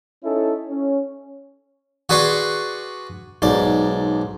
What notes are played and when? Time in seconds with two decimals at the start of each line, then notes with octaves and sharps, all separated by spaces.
0.24 C#4 D#4 E4 A4
0.69 C#4
2.09 F#4 G#4 B4 D5 C6 C#6
3.42 B1 G#2 D5